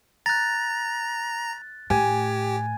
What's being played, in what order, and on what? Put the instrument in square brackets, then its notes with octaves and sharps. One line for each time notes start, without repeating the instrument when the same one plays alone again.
[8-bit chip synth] A#5 [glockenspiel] F#6 A6
[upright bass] A2 [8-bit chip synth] G4 [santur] G#5